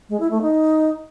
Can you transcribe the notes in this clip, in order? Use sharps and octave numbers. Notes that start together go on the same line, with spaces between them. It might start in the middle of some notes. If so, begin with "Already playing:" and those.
G#3
E4
A3
D#4